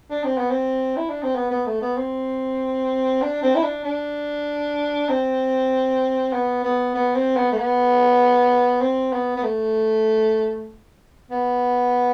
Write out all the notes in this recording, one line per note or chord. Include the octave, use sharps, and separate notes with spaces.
D4
C4
B3
C4
E4
D4
C4
B3
B3
A3
B3
C4
D4
C4
E4
D4
D4
C4
B3
B3
B3
C4
B3
A3
B3
C4
B3
B3
A3
B3